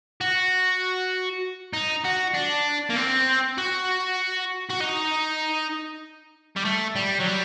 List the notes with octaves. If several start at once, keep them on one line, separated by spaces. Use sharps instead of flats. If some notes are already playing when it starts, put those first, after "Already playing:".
F#4
D#4
F#4
D4
A#3
C4
F#4
F#4
D#4
G3
A3
G3
F#3
G3